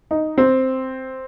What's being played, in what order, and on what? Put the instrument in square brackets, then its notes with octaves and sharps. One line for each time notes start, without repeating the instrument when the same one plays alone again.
[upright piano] D#4
C4